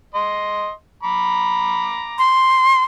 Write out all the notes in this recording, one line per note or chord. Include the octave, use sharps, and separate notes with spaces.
D#5 C6
A#5 B5 D6
C6